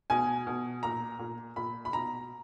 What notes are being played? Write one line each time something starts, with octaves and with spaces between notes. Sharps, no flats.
B2 G#5
B2
A#2 A#5
A#2
A#2 B5
B5
B2 A#5